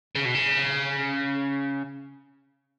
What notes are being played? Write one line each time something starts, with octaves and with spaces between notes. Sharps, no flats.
C#3
B2
C#3